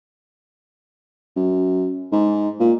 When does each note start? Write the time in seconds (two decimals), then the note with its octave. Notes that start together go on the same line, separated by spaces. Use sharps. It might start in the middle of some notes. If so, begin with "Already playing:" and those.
1.36 F#2
2.12 G#2
2.60 A#2